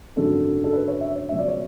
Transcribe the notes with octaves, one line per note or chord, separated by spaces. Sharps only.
G#1 F#2 D3 F#3 A4
A4
B4
C#5
E5
C#5
C#2 B2 F#3 E5
D5
C#5